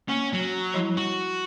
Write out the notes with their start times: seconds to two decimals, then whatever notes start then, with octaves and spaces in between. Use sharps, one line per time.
0.09 A#3 C#4
0.33 F#3
0.74 F3 G3 E4
0.97 F#4